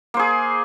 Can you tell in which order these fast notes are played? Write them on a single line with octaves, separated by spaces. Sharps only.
A#3 C5 G#4